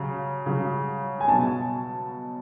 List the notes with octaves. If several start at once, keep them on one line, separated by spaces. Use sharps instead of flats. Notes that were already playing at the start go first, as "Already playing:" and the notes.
Already playing: C#3 F#3
C#3 F#3
G#5
B2 F#3 A5